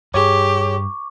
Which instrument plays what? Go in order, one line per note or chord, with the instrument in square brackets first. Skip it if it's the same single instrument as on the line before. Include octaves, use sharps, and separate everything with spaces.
[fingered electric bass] G2 [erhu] G4 [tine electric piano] G#4 C#5 [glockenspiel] C#6 D6